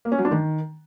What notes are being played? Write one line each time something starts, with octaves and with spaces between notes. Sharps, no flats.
A#3
C#4
F#3
D4
D#3